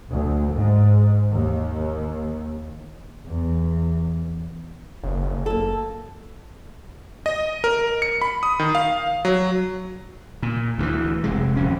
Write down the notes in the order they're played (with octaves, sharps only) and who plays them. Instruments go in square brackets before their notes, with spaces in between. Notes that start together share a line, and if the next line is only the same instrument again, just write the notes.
[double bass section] D2
G#2
D#2
[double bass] E2
[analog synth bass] F#1
F#1
[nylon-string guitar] A#3 A4
[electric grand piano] D#5
A#4
C#7
B5
D#6
D#3
F5
F#3
[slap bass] A#2
D2 D#3 E3
F1 C3 G#3
D1 F2 C#4